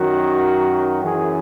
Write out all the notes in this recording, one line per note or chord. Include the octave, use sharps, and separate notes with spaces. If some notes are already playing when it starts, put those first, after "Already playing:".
Already playing: F#2 D#3 F#3 F#4
F#2 E3 G#4